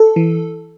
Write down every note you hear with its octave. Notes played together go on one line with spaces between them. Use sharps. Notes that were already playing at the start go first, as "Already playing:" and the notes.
Already playing: A4
E3